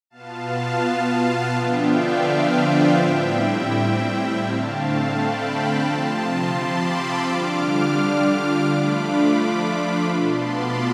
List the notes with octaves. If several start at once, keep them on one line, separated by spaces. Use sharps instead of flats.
B2 B3 F4 F5 A5
D3 F3 B3 D4 F4 E5 G5
D5 F5
C5 E5
D5 F5
A2 G3 C4 E4 E5 G5
D3 A3 C4 F5 A5
G5 B5
C3 F3 C4 F4 A5 C6
A5 C6
B5 D6
C6 E6
D3 G3 D4 F4 D6 F6
F3 A3 D4 F4 B5 D6
B2 B3 F4 A5 C6
B5 D6